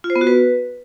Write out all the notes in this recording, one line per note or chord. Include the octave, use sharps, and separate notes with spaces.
F4
C5
B3
F#4
B4